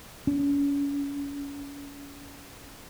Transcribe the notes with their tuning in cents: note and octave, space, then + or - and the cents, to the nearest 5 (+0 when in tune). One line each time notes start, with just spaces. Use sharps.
C#4 +35